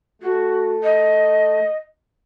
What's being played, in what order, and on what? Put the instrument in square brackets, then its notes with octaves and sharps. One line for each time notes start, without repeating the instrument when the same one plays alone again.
[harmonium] A3 [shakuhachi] F#4
[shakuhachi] D#5